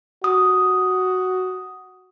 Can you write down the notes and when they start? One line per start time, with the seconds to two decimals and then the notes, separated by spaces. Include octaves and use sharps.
0.24 F#4 D#6